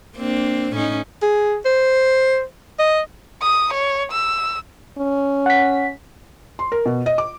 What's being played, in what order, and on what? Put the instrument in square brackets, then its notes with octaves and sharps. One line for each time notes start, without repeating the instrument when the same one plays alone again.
[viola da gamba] A#3 C4 D4
A2 C#4 D#4
[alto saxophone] G#4
C5
D#5
[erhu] D#6
C#5
E6
[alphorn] C#4
[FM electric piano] F#5 B6
[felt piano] C6
A#4
B2
D#5
D6